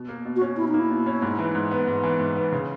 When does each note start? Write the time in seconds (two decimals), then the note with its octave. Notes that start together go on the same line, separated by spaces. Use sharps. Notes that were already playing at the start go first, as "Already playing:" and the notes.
Already playing: B2
0.09 A#3
0.25 B2
0.36 F#4
0.41 C#4
0.57 B2 E4
0.68 D#4
0.74 A#3
0.80 E4
0.90 B2
1.06 C#4
1.22 G#2
1.39 E3
1.55 G#2
1.71 B3
1.87 G#2
2.03 E3
2.20 G#2
2.36 B3
2.52 C#3